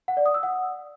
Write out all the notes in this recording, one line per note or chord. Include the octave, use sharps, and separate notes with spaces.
F#5
D5
D#6
E6
F#5